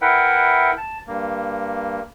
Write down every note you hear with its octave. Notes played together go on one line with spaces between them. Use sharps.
E4 A#4 B4 E5 F#5 G5
A5
G2 A#3